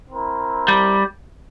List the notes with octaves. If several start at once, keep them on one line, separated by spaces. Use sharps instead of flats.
C4 E4 A#4
G3